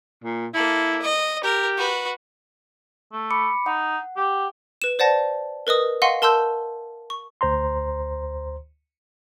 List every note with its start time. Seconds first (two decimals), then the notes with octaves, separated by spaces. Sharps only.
0.24 A#2
0.54 A#3 E4 A4
1.02 D#5
1.44 G4 A#4
1.77 F#4 B4
3.12 A3
3.31 B5 D6 C#7
3.66 D#4 F#5
4.16 G4
4.82 B4 E7
4.99 C5 D5 F#5 A5 A#6
5.67 A#4 B4 D#5 D#6
6.02 D#5 F5 F#5 G#5 C6 C#6
6.22 A#4 A5 C6 E6 G6
7.10 C#6
7.41 D2 C5 A#5 C6